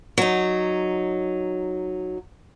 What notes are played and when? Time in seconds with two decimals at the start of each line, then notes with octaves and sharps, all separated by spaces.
0.18 F#3 D#4